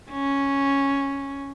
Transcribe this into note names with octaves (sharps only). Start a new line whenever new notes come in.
C#4